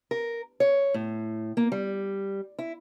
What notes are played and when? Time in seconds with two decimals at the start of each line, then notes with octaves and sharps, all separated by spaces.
0.11 A#4
0.60 C#5
0.94 A2
1.57 A#3
1.72 G3
2.59 E4